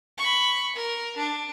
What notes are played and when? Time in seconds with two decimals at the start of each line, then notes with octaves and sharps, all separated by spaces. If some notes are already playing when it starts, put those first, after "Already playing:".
0.18 B5 C#6
0.75 A#4
1.16 D4